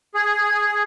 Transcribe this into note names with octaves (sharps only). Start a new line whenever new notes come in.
G#4